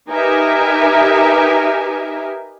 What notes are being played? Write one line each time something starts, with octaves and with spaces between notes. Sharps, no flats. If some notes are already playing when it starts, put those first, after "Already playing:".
D#4 G4 A#4 B4 E5 G#5